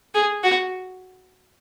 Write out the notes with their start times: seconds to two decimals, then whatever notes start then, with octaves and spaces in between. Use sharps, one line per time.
0.15 G#4
0.44 F#4